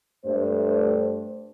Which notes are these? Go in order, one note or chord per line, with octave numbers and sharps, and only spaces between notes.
G2 A3 C5